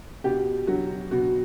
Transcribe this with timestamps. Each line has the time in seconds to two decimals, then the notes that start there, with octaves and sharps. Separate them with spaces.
0.24 B2 G4
0.67 F#3 F#4
1.11 B2 F#4